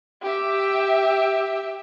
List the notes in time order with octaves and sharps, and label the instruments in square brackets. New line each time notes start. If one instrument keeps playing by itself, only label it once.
[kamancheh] G4 E5